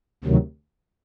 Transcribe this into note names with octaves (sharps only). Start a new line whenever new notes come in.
D2 C3 D#3 F#3